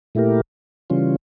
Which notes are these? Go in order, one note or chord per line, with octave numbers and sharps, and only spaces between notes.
A#2 A3 E4 G4 A#4
C#3 E3 G3 C#4 F4